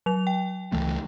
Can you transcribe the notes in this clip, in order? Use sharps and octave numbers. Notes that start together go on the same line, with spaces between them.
F#3 F7
G5
C#2 E3 A3